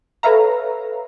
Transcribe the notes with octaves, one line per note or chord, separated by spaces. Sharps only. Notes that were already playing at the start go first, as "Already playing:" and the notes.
A4 B4 C#5 E5 F5 A#5